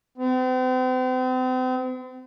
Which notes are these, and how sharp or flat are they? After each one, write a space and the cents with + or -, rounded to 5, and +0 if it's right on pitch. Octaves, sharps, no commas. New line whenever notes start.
C4 -40